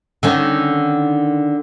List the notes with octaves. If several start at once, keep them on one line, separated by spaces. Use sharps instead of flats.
D3 D#3 C#4